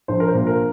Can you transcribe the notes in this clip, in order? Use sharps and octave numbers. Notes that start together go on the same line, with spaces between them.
A#1 C5
A#4
C5
A#2
A#4